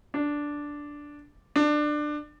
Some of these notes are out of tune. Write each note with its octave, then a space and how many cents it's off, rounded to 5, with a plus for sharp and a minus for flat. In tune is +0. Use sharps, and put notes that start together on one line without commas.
D4 -5
D4 +20